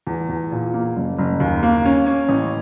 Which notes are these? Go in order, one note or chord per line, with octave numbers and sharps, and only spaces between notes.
E2
E2
A#2
A#3
F#1
F#1
D#2
A#3
C#4
C#4
A1